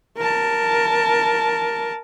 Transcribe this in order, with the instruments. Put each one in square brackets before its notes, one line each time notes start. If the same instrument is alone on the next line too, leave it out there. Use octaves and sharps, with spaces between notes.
[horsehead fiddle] A#4 A5